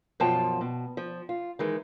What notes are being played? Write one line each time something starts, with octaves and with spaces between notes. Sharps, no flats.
F#2 B2 F3 F4 G5 A5
B2
F3
F4
D#3 E3 G#3